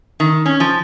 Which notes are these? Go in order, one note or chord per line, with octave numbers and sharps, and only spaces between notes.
D#3
C#4
F3